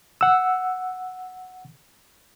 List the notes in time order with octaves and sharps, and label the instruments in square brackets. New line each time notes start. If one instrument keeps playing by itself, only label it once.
[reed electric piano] F#5 E6